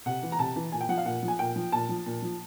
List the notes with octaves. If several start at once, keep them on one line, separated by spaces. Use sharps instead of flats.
C3 F#5
E3
A#5
C3 A5
E3
A#2 G#5
G5
F3 F#5
F5
A#2 F#5
F3
G#5
A#2 G5
F3
A#2 A5
F3
A#2
F3